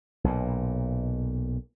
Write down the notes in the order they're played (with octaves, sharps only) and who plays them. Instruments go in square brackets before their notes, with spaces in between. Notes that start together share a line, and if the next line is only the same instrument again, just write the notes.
[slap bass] B1 A#2